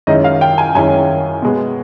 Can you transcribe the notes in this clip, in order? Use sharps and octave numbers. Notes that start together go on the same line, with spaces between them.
F#2 D#3 G#3 C#4 E4 D#5
F5
G5
G#5
F#2 D#3 G#3 C#4 E4 G#5
B2 G#3 B3